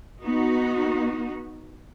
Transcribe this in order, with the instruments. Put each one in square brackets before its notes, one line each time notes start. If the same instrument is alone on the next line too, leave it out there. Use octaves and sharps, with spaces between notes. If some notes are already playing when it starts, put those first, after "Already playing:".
[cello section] B3 D#4 F#4